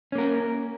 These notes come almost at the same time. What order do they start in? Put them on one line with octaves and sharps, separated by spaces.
C#4 A#3 A#4